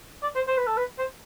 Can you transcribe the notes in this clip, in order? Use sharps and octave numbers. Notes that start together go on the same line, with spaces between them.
D5
C5
C5
B4
A4
B4
C5